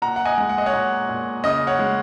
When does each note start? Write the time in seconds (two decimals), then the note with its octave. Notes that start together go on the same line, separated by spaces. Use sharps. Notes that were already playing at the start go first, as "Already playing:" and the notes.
0.02 A#2 F#5 A#5
0.16 F#5
0.25 D#5 G#5
0.38 G#3
0.49 F#5
0.58 D#5
0.66 C#5 F#5
0.73 A#2
1.09 A#2
1.43 C#3 D#5
1.67 C#5 F#5
1.79 G#3